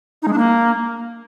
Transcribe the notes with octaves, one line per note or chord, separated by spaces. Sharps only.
D#4
G#3
D4
A#3